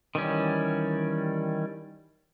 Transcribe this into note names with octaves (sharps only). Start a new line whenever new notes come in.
D#3 E3 G3 C#4